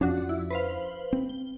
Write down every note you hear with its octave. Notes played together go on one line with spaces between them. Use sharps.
F2 F3 C#4 D4 F#4
E4
B4 C5 F5
C4
G7